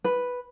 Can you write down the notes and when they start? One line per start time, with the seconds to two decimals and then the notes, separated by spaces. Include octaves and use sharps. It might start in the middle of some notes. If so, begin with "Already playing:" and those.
0.04 B4